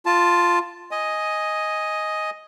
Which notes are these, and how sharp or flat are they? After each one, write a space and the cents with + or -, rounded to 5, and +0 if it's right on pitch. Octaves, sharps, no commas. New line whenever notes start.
F4 +0 A5 +0
D#5 +5 G#5 +0